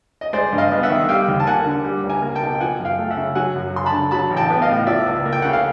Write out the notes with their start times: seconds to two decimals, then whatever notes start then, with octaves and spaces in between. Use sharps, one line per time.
0.21 D#5
0.33 G#3 C5 D5
0.53 G2
0.58 D#5 F5
0.72 B3
0.83 E5 F#5
0.90 D#3
1.09 G3 F5 G5
1.28 D#2
1.40 A5
1.46 A#3 F#5 G#5
1.66 D3
1.85 G3
2.04 C#2
2.09 G#5 A#5
2.22 A#3
2.35 G5 A5
2.42 B2
2.55 G5
2.60 F3 F#5 G#5
2.79 F#2
2.85 F5 G5
2.99 A3
3.10 E5 F#5
3.17 C#3
3.35 F#3 F#5 G#5
3.55 F#2
3.74 F#2 C6
3.86 A5 B5
3.92 D3
4.11 F#3 A5 B5
4.30 A1
4.37 G5 A5
4.50 B3
4.62 D#5 F5
4.69 A2
4.87 F3 D5 E5
5.06 C#2
5.26 A#3
5.32 G5
5.42 C#3 F#5
5.53 F5